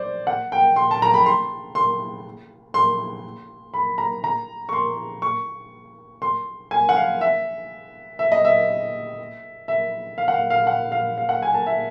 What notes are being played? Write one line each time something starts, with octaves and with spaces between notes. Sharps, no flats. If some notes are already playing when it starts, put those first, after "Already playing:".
Already playing: C5 D5
F#5
G5
C6
A5
A#5
B5
C6
C6
C6
B5
A#5
A#5
C#6
C6
C#6
C6
G#5
F#5
F5
E5
E5
D#5
E5
E5
F5
F#5
F5
F5
F#5
F5
F5
F#5
G#5
A5
E5